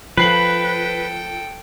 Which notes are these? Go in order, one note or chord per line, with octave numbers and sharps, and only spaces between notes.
F3 A4 B4 G5 F#6 C7 F#7